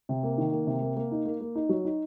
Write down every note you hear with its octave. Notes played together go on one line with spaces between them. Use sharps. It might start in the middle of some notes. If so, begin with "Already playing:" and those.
C3
A#3
D#3
A#3
C3
A#3
A#3
D#4
A#3
A#3
D#4
F#3
D#4